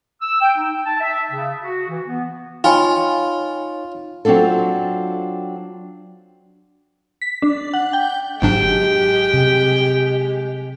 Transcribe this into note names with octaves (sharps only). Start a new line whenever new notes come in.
E6
G5
D#4
A5
E5
C#3
F#4
E3
B3
D#4 F4 C#5 G5 G#5 B5
F#3 C4 D4 F4 A4
B6
D4
F#5
G5
G1 G#2 F#3 G#3 D4 G4 G5
C3